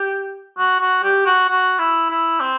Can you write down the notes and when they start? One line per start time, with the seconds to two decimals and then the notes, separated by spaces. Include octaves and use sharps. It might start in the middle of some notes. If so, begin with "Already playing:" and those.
Already playing: G4
0.58 F#4
0.80 F#4
1.03 G4
1.26 F#4
1.49 F#4
1.79 E4
2.10 E4
2.40 C4